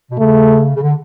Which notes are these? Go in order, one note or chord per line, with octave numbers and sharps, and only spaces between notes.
B2
C#3 A3
C#3
D3